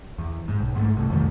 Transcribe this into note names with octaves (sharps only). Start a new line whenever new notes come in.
E2
G#2
B1
G#2 F#3 A3
G1 C2 A2
C2 F2 D#3 A3